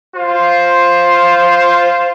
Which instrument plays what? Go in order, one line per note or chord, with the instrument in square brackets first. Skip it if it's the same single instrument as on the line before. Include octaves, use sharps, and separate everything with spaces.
[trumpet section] F4 C5